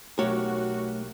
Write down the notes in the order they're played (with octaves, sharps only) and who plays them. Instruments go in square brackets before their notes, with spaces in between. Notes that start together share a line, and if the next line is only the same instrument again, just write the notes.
[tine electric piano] B1 G4 A#4 [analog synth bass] A3 [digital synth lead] F#4 [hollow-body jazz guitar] C#5